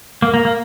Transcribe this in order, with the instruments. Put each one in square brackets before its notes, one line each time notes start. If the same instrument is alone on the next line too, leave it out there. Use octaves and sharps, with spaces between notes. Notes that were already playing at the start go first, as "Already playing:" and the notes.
[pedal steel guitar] A#3
A#3
A#3